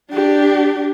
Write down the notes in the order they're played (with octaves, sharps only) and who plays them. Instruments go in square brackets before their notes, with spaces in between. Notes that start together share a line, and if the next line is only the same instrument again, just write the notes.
[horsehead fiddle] D4 G4